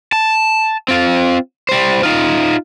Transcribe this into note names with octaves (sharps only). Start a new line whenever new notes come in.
A5
C4 F4
G3 C5
D#4 F4